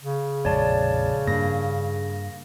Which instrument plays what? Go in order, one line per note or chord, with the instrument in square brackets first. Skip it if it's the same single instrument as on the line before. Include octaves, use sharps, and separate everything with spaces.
[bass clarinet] C#3
[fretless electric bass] A#1 F2 G#3 [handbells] C#5 D5 A5
[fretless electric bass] G2 D4 [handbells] A#3 A#6